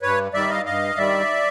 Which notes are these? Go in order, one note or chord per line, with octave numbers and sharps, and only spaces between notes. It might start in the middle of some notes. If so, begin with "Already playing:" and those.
G2 B4 C#5
D#3 G3 D5 E5
D#5 F5
G2 D#5 F5
D#3 G3 D5 E5